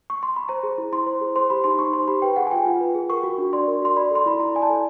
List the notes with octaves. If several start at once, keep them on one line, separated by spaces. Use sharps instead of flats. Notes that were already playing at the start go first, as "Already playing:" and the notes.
C#6
C6
B5
C5 A#5
G#4
E4
E4 C6
C5
G#4
C5 C6
G4 B5
D#4 C6
D#4 C#6
C5 C6
G4 B5
B4 G5
G#4 F#5
G#5
F4 G5
F4
B4
G#4
A#4 C#6
F#4
D4
D5 C6
A#4
F#4 C6
D5 B5
A4 C6
E4 B5
E4 A#5
D5 G#5
A5
A4